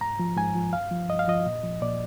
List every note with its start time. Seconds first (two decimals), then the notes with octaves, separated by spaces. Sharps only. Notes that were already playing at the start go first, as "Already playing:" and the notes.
0.01 G#2 A#5
0.19 F3
0.37 G#2 G#5
0.55 F3
0.73 G2 F5
0.91 F3
1.09 G2 D#5
1.19 F5
1.28 F3 D#5
1.46 A#2
1.63 F3
1.82 A#2 D5